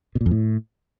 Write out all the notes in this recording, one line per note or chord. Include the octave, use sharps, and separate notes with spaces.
B2
A#2
F2
A2